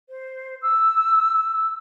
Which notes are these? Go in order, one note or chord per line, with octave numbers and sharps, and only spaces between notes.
C5
E6